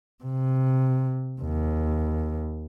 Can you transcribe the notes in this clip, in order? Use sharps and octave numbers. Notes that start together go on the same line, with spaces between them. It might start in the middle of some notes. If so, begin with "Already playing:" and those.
C3
D#2